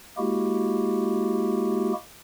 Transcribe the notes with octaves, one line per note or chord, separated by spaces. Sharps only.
G#3 A#3 E4 F#4 G4